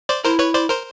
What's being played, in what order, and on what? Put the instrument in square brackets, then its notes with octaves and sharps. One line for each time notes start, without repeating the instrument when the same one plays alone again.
[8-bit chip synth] C5 D5
[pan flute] E4 [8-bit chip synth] A#4 C5
[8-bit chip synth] B4 C#5
C5 D5
A#4 C5